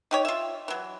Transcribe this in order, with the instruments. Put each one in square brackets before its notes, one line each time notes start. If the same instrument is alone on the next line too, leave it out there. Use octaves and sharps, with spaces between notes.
[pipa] D#4 G4 C#5
F4 E5
E3 F#3